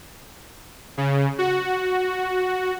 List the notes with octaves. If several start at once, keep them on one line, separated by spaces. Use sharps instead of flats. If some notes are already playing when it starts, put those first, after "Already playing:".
C#3
F#4